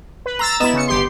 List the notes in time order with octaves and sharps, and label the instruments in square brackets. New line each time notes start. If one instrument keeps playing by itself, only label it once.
[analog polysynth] B4
[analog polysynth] A#5 E6 A6 [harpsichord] C6
[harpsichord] B3 D#5 A#5 [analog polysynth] E4 E7
[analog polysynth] C#3 C#7
G1 G4 C6